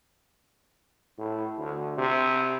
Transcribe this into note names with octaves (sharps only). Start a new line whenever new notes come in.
A2
D2
C3